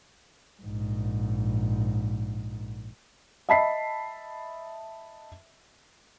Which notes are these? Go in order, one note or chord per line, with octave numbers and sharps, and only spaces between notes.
A#1 G#2
D#5 E5 A5 B5 B6 C7